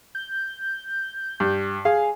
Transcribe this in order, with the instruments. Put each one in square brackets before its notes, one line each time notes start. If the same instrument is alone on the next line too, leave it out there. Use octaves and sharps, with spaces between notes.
[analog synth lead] G6
[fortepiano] G2
[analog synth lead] G#4 [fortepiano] F5